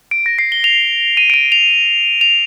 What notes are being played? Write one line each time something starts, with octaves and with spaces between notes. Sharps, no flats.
D7
A#6
C7
G7
F7
D#7
D7
D#7
F7
F7